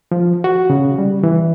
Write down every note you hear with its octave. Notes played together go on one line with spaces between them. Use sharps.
F3
F#4
C#3
G3
E3